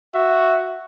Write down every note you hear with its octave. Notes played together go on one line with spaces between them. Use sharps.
F#4 E5